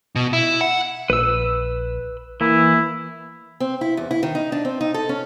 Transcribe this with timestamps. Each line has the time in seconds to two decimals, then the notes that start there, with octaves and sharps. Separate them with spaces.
0.16 B2
0.33 E4
0.61 F#5
1.10 A#1 B4 E6
2.41 E3 A#3 E4
3.60 C4
3.81 E4
3.97 E2
4.11 E4
4.23 D#3
4.35 D#4
4.52 D4
4.65 C4
4.81 D#4
4.94 A4
5.09 C#4